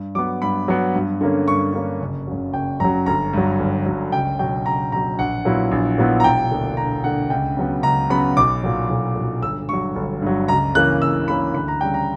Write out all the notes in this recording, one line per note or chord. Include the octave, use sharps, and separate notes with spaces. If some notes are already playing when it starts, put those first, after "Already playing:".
Already playing: G2
F#3 B3 D6
G2 B5
F#3 B3
G2
D3 A#3 C#4
G2 C#6
D3 A#3 C#4
F#1
F#2 C#3 F#3
F#1 G5
F#2 C#3 F#3 A#5
G1 A#5
G2 F#3
G1
G2 F#3
C#2 G5
B2 F#3 G5
C#2 A#5
B2 F#3 A#5
A#1 F#5
A#2 F#3 B3 E4
A#1
A#2 F#3 B3 E4
A#5
E1 G5
D2 D3 A#3 D4
E1 A#5
D2 D3 A#3 D4 F#5
C#2 G5
C#3 F#3 B3
C#2 A#5
C#3 F#3 B3 B5
B1 D6
A#2 F#3
B1
A#2 F#3
G1 E6
G2 F#3 C#6
G1
G2 F#3
C#2 A#5
C#3 E3 A#3 C#4 F#6
C#2 E6
C#3 E3 A#3 C#4 B5
D2 B5
A#5
C#3 G3 G5
A#5